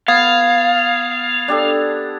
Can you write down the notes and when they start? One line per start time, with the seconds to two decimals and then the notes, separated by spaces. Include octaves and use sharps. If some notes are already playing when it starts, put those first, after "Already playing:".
0.08 B3 F5 D#6 G#6 A6
1.48 D4 G4 A4